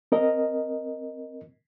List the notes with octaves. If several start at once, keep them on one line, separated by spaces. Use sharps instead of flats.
C4 A#4 D#5